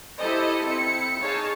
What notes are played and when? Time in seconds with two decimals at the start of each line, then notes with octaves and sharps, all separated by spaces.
0.18 E4 G4 A4 C5 D#5
0.66 C4 E4 C#7
1.18 D#4 G#4 C#5 F5 A5